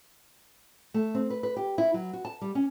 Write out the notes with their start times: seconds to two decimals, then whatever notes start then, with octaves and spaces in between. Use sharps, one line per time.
0.94 A3
1.15 C4
1.30 B4
1.43 B4
1.57 G4
1.78 E4
1.94 F#3
2.13 F#4
2.25 A5
2.41 G3
2.55 C#4